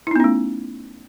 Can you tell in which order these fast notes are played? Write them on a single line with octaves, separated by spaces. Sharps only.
E4 D#4 B3 C#4 A3